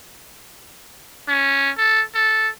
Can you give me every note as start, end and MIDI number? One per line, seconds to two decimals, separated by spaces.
1.28 1.71 61
1.78 2.03 69
2.15 2.49 69